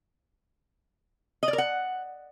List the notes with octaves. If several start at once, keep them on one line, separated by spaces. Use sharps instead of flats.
D#5
D5
A#4
F#5